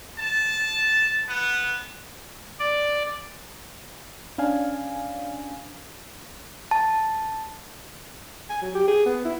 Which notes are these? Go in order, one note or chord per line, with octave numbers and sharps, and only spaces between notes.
A5
B3
D5
C#4 D4 F5 G#5
A5
G#5
F#3
G4
G#4
B3
E4